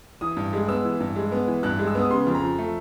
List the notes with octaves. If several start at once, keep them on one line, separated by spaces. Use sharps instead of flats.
E3 D#6
G2
G#3
B3 E6
E3
G2
G#3
B3
E3
G2 F#6
G#3
E6
B3 D#6
C#3 C6
F2
A#5
F3
A3